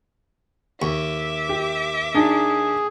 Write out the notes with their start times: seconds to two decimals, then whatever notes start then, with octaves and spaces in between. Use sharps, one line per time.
0.82 D#2 E5 C#6 D6
1.49 G4
2.15 D4 D#4 G#4